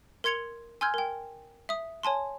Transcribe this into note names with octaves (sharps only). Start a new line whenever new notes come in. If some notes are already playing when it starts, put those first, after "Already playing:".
A#4 C6 G#6 C#7 F7 G7
G#5 C6 E6 F6 G6 G#6
A#4 G5
E5 D#6
C#5 G#5 A5 C6